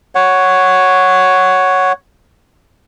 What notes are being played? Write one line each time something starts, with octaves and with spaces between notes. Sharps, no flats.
C#5 F#5